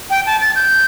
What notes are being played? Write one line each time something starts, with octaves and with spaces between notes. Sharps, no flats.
G5
A5
A6
G6